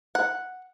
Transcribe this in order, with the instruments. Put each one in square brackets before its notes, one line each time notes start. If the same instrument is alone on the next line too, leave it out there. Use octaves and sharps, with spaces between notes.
[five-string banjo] F#5